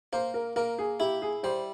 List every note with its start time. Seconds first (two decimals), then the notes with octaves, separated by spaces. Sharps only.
0.13 A#3 C5
0.34 A#4
0.56 A#3 A#4
0.79 G#4
1.00 E4 G4
1.22 G#4
1.43 G3 C5